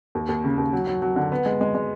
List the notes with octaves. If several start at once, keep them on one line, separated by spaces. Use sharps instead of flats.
D#2
D#2
C#3
D#2
F#3
F#3
F#3
D3
B3
G#3
G#3
G#3